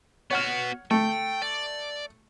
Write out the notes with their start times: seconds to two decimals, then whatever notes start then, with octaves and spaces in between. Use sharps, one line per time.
0.31 B3 F#4 C#5 F#5 F6
0.91 A3 G5
1.42 D5